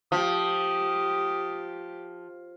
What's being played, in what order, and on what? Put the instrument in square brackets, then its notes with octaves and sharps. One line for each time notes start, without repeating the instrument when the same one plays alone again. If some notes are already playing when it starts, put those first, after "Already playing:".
[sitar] F3 [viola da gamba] G4 [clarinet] D#6